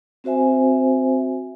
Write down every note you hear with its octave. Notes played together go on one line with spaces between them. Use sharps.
C4 F#4 C5 E5 G#5